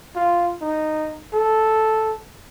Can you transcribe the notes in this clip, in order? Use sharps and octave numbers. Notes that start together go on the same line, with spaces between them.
F4
D#4
A4